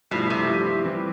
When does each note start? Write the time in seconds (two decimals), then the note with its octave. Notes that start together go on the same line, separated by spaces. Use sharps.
0.11 G2 B2 F3 A3 E4
0.30 C3
0.48 G2 F3 A3 E4
0.85 E3 G3 C4 G4